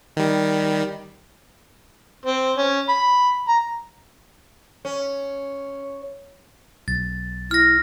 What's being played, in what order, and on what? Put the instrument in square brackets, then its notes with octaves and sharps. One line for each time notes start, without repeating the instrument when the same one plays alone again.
[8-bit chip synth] D#3 G3
[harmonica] C4
C#4
B5
A#5
[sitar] C#4
[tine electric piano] B1 [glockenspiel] A6
[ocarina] E4 [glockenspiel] F6 A#6